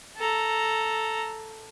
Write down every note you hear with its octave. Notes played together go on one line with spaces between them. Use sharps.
A4 A#5